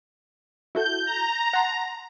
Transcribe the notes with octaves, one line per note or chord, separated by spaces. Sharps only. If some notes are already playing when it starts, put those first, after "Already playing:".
E4 F#4 A4 G6
A#5
F#5 A5 C6